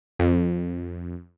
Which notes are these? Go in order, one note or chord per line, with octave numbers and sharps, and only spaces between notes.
F2